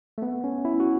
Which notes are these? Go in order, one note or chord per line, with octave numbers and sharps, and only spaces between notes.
A3
B3
C#4
E4
F#4